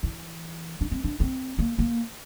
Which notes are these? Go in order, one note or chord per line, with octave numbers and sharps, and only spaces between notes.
E3
D4
C4
D4
C4
A#3
A#3